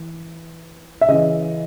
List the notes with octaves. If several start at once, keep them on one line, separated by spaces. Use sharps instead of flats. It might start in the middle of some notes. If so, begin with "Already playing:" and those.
Already playing: E3
E5
C#3 E3 D#5